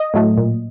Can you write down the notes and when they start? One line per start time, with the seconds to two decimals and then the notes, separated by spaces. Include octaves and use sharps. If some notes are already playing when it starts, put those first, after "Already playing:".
Already playing: D#5
0.14 A2 F#3 A3
0.37 A#2